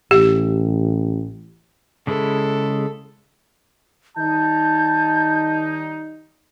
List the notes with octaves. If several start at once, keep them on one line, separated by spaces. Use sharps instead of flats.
A1 G4
C#3 G#3 E4 A4
D#3 G3 D#4 A5 G6